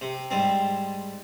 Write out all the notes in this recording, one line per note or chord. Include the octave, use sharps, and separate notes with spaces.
C3
G#2 G3 C4